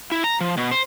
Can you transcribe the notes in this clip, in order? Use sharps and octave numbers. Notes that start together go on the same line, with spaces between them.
E4
A#5
F3
B2
C5